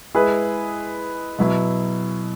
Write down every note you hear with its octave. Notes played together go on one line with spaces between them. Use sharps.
G#3 E4 G#4 B4
B2 F#3 E4